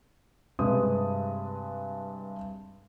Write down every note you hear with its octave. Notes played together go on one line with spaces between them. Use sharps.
G2 C3 G#3 G#4 B4 D#6